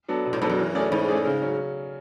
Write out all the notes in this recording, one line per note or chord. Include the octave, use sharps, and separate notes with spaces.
F#3 B3 D4 A4
B2
A2
G#2 F#3 B3 D4 A4
F#2
E3
A3 C#4 G#4 D5
G#2 E3
A3 C#4 G#4 D5
C#3
F#3 C#4